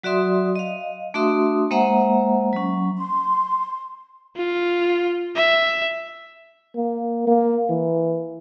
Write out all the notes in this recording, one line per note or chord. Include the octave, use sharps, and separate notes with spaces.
F#3 F#4 D5 E5 C6 D#6
D#5 F5
A3 D4 F#4 E5 C6 D#6
G#3 A#3 C5 E5 F#5 A#5
F#3 C#4
C6
F4
E5
A#3
A#3
E3